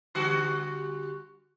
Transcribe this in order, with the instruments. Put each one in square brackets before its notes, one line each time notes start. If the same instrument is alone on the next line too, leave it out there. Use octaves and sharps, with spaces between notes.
[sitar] D3 G3 F#4